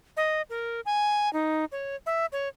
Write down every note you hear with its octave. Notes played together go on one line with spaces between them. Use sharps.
D#5
A#4
G#5
D#4
C#5
E5
C#5